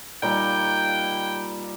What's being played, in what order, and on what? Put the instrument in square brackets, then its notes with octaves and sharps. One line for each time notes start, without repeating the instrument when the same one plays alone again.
[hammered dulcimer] A#2 G3 D#4 [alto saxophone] G5